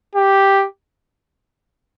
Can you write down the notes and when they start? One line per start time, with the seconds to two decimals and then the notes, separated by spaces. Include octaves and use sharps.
0.16 G4